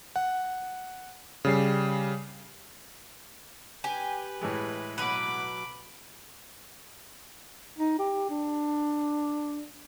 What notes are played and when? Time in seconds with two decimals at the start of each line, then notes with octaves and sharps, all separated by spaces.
0.16 F#5
1.45 C#3 G3 C7
3.84 G4 B4 G#5
4.41 A2 E3 G#3
4.98 B2 F#3 B4 F#5 B5 D6
7.79 D#4
7.99 G4
8.30 D4